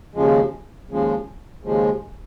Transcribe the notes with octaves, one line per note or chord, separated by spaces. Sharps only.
D#2 C#3 F3 G#3
D#2 C#3 F3 G#3
D#2 C#3 F3 G#3